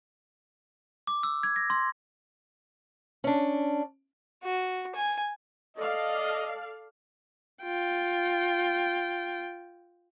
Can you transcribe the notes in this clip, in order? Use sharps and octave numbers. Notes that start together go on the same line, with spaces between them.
D6
E6
G#6
A#6
C6
C#4 D4
F#4
G#5
A4 D5 D#5 F5
F4 G5